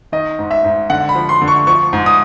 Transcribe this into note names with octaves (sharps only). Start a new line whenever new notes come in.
D#3 D#5
G#2
E5
G#2
D3 F#5
B5
F3
C6
D3
C#6
F3 C#6
G#2
D#6